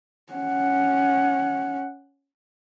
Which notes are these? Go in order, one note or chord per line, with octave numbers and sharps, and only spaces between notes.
C#4 F#5